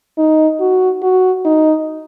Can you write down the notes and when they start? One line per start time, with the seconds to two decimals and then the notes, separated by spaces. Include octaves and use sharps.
0.18 D#4
0.60 F#4
1.02 F#4
1.45 D#4